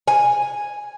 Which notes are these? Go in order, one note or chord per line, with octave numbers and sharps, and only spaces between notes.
G#5